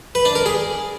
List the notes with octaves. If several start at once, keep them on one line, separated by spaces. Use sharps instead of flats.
B4
D4
A#4
G#4